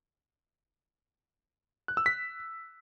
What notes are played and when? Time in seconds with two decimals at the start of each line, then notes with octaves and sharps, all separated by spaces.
1.88 F#6
1.97 E6
2.06 B6